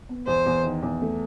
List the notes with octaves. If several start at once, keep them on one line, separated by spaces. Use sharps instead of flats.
B3
E2 C5
E2
D#3
E2
A3